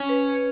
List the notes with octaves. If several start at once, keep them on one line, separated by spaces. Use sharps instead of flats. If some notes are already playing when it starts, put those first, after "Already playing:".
Already playing: C#4
B4